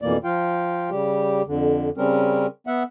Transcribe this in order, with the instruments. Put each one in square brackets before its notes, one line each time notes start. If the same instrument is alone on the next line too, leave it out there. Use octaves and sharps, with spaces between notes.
[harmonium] F2 B2 E3 A#3 D5
F3 F4 F5 G5
C#3 G3 G4
F2 D3
C#3 G3 C4 C#4 A#4
B3 E5 F#5